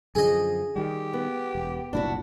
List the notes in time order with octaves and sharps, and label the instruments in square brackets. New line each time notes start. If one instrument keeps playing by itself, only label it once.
[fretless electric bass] F#2 D3 F3 [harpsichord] G#4 D#5
[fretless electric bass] D#3 G3 [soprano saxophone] G4
[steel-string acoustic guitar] B3
[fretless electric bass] E1
[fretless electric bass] F#1 C2 A#2 [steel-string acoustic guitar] D4 E4 F#4